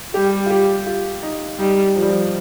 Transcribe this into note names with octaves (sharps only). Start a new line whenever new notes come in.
G3 G4
F4
G4
F4
D#4
G3 D#4
F3
G3
F3